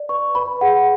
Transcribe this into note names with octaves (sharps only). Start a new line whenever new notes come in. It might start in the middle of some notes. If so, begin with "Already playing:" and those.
Already playing: D5
B4 C#6
B4 B5
G#4 F#5